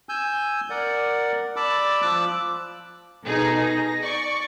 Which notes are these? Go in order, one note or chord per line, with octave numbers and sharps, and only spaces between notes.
G#5 E6 G6
A#4 D5 F#5
D5 A5 B5 D6 E6
F3 D6 E6 F#6
B2 D#4 G#4 A4
A#6
D5 C#6